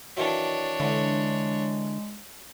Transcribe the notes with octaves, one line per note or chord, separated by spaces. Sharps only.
D#3 E3 F#3 D4 C#5
D3 E3 G#3